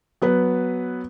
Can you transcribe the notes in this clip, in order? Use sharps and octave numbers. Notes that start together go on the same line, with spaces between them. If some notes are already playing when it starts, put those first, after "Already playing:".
F#3 B3 B4